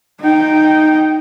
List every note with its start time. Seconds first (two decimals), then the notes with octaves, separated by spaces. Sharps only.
0.20 D#4 G5